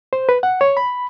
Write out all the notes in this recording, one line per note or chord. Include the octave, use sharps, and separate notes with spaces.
C5
B4
F#5
C#5
B5